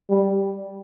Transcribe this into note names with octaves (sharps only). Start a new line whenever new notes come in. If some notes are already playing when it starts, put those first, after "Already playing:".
G3